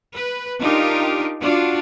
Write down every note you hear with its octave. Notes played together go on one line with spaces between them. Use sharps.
B4
D4 D#4 F4 G4 A#4
D4 F4 F#4